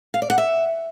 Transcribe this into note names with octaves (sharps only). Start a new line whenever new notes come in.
F5
D5
F#5
E5